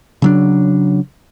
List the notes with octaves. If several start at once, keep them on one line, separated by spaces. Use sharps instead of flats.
C#3 F#3 D4